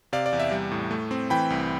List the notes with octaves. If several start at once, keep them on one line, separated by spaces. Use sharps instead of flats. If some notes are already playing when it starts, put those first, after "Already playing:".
C3 D5 F5
D5
E2
E5
G3
A2
A3
C4
E3 G5 B5
C2